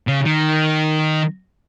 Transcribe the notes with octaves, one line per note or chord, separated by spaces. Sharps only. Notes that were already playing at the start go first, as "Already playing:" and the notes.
C#3
D#3